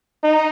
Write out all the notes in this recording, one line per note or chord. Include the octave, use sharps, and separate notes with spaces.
D#4